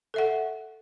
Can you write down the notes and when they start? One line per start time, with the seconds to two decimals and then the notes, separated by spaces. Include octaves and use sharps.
0.14 A4 E5 F#5